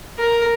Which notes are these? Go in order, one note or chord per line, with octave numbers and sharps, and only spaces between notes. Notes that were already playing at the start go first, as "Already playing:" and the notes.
A#4